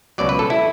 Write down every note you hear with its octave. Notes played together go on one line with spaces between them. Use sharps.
C#2 B2 F#3 D5
B4
A4
E4